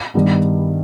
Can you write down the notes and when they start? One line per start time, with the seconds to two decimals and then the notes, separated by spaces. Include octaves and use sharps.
0.14 G2 D#3 G3 B3